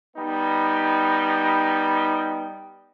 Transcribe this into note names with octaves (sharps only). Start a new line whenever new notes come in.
G3 B3 D#4